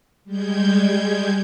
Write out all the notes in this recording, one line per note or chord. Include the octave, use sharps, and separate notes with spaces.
G3 G#3 G6 G#6